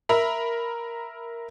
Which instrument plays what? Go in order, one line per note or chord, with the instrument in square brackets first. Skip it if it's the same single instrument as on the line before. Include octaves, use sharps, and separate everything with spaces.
[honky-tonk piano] A#4 E5 B5